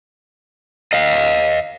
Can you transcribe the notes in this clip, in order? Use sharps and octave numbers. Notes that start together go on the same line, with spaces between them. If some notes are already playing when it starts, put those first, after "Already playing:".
D#5 F5